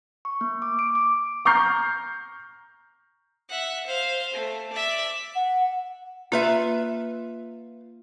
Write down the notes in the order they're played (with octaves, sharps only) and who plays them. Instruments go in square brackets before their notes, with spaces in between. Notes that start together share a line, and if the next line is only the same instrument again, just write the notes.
[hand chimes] C#6
A#3
D6
D7
D6
[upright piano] A#5 C#6 F6 G6 C7
[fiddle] E5 F#5
C5 F5
A3
D5 E5
[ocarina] F#5
[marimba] A#3 [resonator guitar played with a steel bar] F4 B4 E5